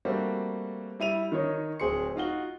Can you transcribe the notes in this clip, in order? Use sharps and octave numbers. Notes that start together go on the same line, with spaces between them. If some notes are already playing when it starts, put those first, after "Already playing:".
G3 A3 A#3 C4 F#4
G3 E4 D#7 F7
D#3 D#4 C#5
D1 C4 G#4 C6 C#7
D#4 F4 F#4 G7